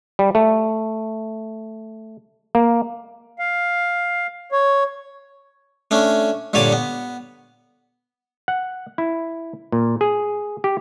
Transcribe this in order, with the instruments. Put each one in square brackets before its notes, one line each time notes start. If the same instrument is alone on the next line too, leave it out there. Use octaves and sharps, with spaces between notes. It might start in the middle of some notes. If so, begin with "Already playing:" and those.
[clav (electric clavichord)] G3
A3
A#3
[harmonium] F5
C#5
[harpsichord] A3 C#4 D4
G2 A#2 D3 C#5 D5 D6
B3
[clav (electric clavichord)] F#5
E4
A#2
G#4
G4